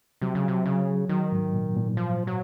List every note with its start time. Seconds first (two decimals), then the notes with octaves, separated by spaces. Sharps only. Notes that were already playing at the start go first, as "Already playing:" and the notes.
0.22 C3 F#3
0.35 C#3
0.44 C3 F#3
0.66 C#3 F#3
1.09 D#3 F#3
1.32 G#2
1.54 A#2
1.76 A#2
1.97 F3
2.27 F#3